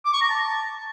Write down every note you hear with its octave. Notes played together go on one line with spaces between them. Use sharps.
D6
C#6
A#5
A5